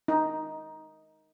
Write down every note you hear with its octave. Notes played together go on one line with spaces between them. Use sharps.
D#4